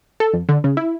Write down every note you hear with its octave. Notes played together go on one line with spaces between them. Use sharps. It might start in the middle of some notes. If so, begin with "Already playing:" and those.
A4
F2
D3
C#3
E4